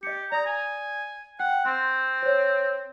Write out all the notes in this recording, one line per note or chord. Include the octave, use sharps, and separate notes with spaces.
G4 D#5 C#7
D5 A#5 D#6
G#5
F#5 G5
C4 C6
C5 C#5